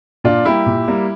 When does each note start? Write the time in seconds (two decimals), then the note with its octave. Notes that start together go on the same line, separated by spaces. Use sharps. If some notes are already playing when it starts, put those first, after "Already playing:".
0.24 A#2 D4 F4
0.45 G3 A#3 E4 G4
0.66 A#2
0.88 G3 A#3